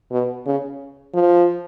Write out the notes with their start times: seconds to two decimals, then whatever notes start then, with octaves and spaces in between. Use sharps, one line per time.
0.12 B2
0.46 C#3
1.14 F3